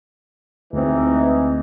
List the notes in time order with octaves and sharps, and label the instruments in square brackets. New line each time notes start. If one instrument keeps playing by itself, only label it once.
[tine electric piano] D2 C4 [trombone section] E3 G#3 D#4